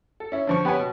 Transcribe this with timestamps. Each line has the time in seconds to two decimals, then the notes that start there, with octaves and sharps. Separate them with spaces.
0.20 A4
0.32 C#4 E4
0.47 D3 F3 C#6
0.65 B3 G4 B4 C#5 G#5 B5
0.79 B2